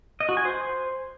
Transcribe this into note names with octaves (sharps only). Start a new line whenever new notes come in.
D#5
F#4
G#5
C5